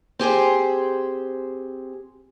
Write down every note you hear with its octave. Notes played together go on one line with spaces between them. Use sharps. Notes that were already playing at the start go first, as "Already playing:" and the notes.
C4 G4 G#4 C5